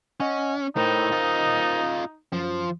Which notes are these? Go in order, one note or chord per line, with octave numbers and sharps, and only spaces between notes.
C#4 D#5 F#5 G#5
A2 D#4 A#4 C5 G5
F4 D#5
F#2 F3